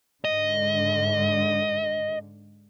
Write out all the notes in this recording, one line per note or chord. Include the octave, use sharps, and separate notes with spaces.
G#2 D3 D#5